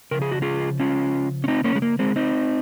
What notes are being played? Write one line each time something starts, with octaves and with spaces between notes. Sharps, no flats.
C#3 F3 A#4
G#4
F#4
F4 G#4
C#4 F4
C#4
C4 D#4
A#3 C#4
G#3
A#3
G#3 C4
C4 D#4